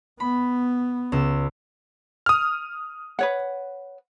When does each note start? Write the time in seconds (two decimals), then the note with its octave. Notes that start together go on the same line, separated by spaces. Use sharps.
0.20 B3 B5
1.12 C#2 E6
2.26 D#6 F6
3.19 B4 C#5 F#5